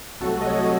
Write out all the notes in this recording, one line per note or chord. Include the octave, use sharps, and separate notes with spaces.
C2 C3 F#3 A3 F#4 A4
D#5
A4 C#5